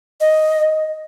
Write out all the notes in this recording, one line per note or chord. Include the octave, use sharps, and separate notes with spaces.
D#5